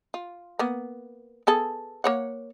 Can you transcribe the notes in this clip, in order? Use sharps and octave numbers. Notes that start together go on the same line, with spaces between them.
F4
A#3 B3
B3 G#4 A4
A#3 C#5 F#5